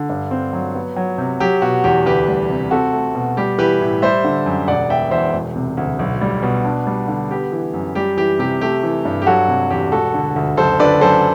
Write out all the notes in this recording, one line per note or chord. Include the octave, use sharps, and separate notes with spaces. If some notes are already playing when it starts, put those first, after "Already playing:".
Already playing: D3
G2
C4
F#3
B3
F#3
C3
F#3 G4
B2 F#4
E2 G4
D2 G4 B4
G3
C3
C4 F#4 A4
A3
B2
G3 G4
E3 G4 B4
A2
G3 C5 E5
D3
F#2
E1 D5 F#5
B2 E5 G5
E2 C5 E5
E1
C3
D2
B1
G3
B2
D4
G3
D3
B3 G4
E3
F#2
G3 G4
E3 G4
C3 G4
A3 G4
E3
G2
G4
F#3 F#4 A4
C3
E2 G4
E1 F#4 A4
D3
D2
F#1 A4 C5
D3 B4 D5
F#2 A4 C5